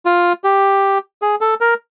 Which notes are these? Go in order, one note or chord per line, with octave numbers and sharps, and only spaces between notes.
F4
G4
G#4
A4
A#4